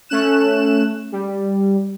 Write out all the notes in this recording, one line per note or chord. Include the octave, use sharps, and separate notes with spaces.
A3 C#4 F#6 E7
G3